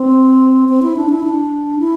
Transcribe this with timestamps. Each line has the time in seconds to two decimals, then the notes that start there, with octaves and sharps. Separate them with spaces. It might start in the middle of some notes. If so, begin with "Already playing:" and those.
Already playing: C4
0.69 C4
0.83 E4
0.97 D4
1.10 E4
1.24 D4
1.79 E4